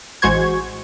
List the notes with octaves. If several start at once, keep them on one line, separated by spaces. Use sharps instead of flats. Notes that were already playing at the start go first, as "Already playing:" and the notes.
A1 G#3 F#4 C5 C#6 G#6